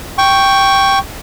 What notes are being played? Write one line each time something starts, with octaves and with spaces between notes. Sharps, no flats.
G5 C#6